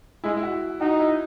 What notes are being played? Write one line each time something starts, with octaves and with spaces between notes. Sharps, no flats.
G#3 E4
E4
F#4
D#4 F#4
E4